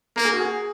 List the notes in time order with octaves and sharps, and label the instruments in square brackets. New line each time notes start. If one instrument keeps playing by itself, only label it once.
[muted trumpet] A#3 [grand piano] A#4
[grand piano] G#4
F#4
G#4